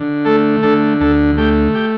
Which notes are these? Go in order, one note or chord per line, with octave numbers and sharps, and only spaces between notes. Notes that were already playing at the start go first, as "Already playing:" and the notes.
Already playing: D3
A3 A4
D3 A4
D2 A4
A3 G4
G4